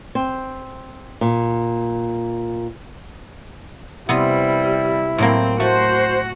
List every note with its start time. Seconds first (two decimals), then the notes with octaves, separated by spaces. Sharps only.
0.15 C4
1.21 A#2
4.09 C3 G3 B3 E4
5.18 A2 F#3 A#3 C4
5.60 A3 F#4 C5